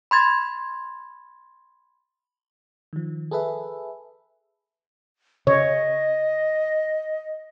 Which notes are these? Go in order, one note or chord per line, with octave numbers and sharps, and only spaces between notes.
B5 C6 G#6 A6
D#3 F3
G#4 A4 B4 E5
C#3 C#5 D#5